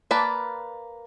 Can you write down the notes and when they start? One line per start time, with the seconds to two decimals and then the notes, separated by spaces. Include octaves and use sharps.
0.11 A#3 B4 D5 A5